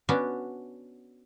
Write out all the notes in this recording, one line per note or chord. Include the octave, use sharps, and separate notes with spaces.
B3 C#4 D4 F#4